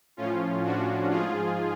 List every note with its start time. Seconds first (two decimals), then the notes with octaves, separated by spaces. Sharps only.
0.17 A2 F3 C#4 F4
0.64 D4 F#4
1.11 G#2 F3 F4 G#4